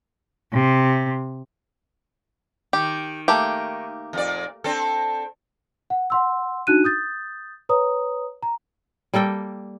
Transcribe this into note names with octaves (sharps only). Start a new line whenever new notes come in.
C3
D#3 G4
A3 A#3 G4
F2 A#2 D5
C4 D4 A4
F#5
F#5 C6 E6
D4 D#4 F#4 F#6 D#7
D#6 G6 A6
B4 C#5 A#5 D#6
A#5
G3 A#3 A4 G5